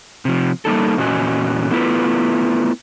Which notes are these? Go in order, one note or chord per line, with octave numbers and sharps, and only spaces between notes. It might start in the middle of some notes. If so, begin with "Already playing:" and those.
C3 F3
G3 A#3 D#4 A4
E2 A#2 C#4 F#4 D#5 G#5
A3 B3 E4 F4 B4